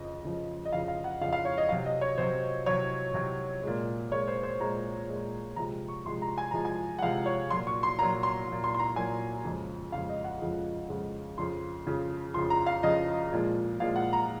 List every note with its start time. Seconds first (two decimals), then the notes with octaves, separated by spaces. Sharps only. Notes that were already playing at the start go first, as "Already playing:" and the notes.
Already playing: F2 C#3 F3 D#5
0.24 F2 C#3 F3
0.65 D#5
0.72 F2 C#3 F3 F5
0.88 F5
1.04 F#5
1.21 F2 C#3 F3 F5
1.33 F5
1.45 C#5
1.58 D#5
1.69 C3 F#3 F5
1.86 D#5
2.01 C#5
2.18 C3 F#3 C5
2.66 C3 F#3 C#5
3.14 C3 F#3
3.63 A#2 G#3
4.11 A#2 G#3 C#5
4.28 C5
4.43 C5
4.60 A#2 G#3 A#5
5.09 A#2 G#3
5.56 C3 F3 G#3 A#5
5.88 C#6
6.06 C3 F3 G#3 C6
6.22 A#5
6.38 G#5
6.51 C3 F3 G#3 A#5
6.65 G#5
6.99 F#5
7.02 C3 F3 G#3 F5
7.26 C#5
7.50 A#2 F#3 C6
7.67 C#6
7.83 C6
7.99 A#2 A#5
8.03 F#3
8.23 C6
8.48 A#2 F#3
8.64 C6
8.74 C6
8.79 A#5
8.96 A#2 F#3 G#5
9.44 F2 C#3 F3 G#3
9.92 F2 C#3 F3 G#3 F5
10.09 D#5
10.24 F#5
10.41 F2 C#3 F3 G#3
10.89 F2 C#3 F3 G#3
11.38 F2 C#3 F3 C6
11.86 F2 C#3 F3
12.34 F2 C#3 F3 C6
12.50 A#5
12.66 F5
12.83 F2 C#3 F3 D#5
13.32 A#2 F3 G#3
13.80 A#2 F3 G#3 F5
13.96 F#5
14.13 A#5